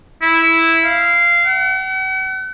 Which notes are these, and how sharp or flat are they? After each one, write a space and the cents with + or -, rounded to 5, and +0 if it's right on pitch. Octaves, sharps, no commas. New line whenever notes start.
E4 -5
F5 -15
F#5 +45